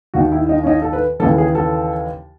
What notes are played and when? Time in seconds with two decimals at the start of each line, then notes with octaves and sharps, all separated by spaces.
0.14 D#2 D#3 F#4
0.32 E4
0.49 D#4
0.63 C#4
0.67 D#4
0.82 A4
0.93 B4
1.20 D#2 C#3 E3 A4
1.38 G#4
1.55 A4